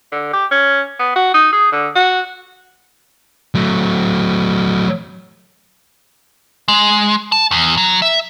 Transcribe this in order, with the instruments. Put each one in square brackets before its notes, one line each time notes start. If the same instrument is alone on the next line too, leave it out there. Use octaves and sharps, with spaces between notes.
[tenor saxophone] D3
G4
C#4
B3
F#4
D#4
G#4
D3
F#4
[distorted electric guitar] F#3 A3
[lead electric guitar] G#3
A5
E2
F#3
E5